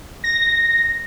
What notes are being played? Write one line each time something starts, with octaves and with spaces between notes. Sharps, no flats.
A#6